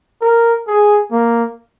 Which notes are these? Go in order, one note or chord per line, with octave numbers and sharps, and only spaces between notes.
A#4
G#4
A#3